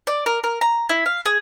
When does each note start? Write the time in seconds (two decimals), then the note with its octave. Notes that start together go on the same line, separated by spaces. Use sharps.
0.07 D5
0.26 A#4
0.44 A#4
0.61 A#5
0.89 E4
1.06 F5
1.26 G#4